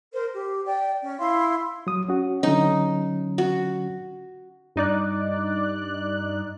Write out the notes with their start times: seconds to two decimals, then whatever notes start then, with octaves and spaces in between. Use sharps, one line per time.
0.13 A#4 C5
0.33 G4
0.65 D5 G5
1.02 C#4
1.18 E4 F5 C6
1.87 F#3 D#6
2.08 C#4 F#4
2.43 D3 F#3 C#4 D#4
3.38 F#4
4.76 G2 D#4 D5 F#6